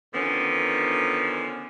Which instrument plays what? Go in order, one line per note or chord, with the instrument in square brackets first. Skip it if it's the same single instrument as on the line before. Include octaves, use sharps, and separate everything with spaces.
[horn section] D3 D#3 F3 B3 C#4